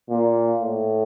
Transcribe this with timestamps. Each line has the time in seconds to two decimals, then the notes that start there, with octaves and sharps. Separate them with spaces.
0.10 A#2
0.62 A2